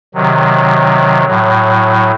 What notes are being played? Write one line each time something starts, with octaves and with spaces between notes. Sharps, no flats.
C3 D#3 F#3
A2 F#3